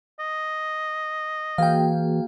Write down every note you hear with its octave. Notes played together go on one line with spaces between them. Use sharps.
D#5
E3 A#3 F#4 G#4 F5 G5